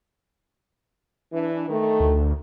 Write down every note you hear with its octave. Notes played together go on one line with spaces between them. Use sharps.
E3 D4
D#3 A3
D2